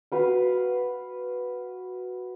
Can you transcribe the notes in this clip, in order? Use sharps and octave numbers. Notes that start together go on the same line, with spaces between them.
F#4 B4 F5